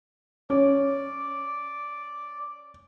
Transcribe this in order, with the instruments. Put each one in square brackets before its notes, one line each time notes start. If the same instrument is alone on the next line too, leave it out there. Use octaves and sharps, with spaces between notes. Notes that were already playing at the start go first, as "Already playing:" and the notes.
[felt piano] C#4 [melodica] D5